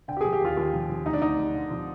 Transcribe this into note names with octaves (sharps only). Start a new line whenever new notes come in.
D3 G5
G4
F3 G#4
G4
D#2 F4
D#2 F4
F3
F3
D2 D#4
D4
D2 D#4
D2
D3
F3